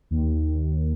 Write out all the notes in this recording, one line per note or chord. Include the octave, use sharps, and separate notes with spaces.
D#2